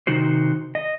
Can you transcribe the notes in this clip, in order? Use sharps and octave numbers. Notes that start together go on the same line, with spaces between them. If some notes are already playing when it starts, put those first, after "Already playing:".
C3 D#3 D#4 F#4 C5
D#5